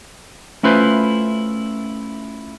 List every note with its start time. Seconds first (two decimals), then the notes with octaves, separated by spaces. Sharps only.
0.63 A3 C#4 E4 F4 B4 C5